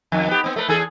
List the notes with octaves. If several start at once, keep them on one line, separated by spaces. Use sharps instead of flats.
F2 D#3
B3 G4
B3 C4
A3 A#4 B4
E2 G#4 A4